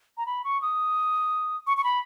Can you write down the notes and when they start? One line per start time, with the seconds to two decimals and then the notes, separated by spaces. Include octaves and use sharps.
0.17 A#5
0.26 B5
0.44 C#6
0.62 D#6
1.67 C#6
1.77 C#6
1.84 B5